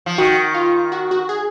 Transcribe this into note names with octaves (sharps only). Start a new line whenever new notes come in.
F3
D#3 F#4
F4
F#4
F#4
G#4